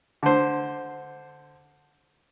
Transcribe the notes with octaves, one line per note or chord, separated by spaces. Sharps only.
D3 C5